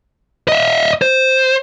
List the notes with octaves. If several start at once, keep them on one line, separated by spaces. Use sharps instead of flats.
D#5 E5
C5